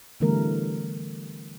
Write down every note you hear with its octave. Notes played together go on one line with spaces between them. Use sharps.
D3 E3 G3 A3 B3 A#4